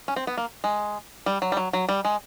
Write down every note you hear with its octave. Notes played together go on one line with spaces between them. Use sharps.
C#4
C4
B3
A#3
G#3
G3
F#3
G3
F#3
F#3
G3
G#3